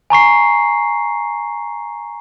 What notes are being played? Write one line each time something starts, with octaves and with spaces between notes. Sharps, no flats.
G#5 A#5 C#6 C7